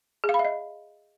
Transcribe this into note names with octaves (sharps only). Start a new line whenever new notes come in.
G#4
F5
B5
E5
D#5